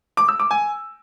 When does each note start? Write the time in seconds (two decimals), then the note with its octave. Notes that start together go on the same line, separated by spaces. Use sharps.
0.17 D6
0.28 E6
0.40 D6
0.51 G#5